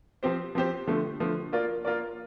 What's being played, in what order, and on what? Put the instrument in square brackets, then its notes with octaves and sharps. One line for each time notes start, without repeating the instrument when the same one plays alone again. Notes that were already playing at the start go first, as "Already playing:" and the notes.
[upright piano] F3 C4 G4 C5
F3 C4 G4 C5
D3 F3 A3
D3 F3 A3
A#3 F4 A#4 D5
A#3 F4 A#4 D5